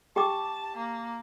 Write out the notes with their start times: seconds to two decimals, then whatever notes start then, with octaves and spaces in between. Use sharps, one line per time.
0.16 G4 G5 A5 D6
0.77 A#3